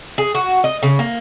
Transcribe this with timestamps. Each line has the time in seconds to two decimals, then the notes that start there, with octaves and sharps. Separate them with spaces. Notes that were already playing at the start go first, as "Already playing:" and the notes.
0.18 G#4
0.35 F#4
0.64 D#5
0.83 C#3
0.99 A#3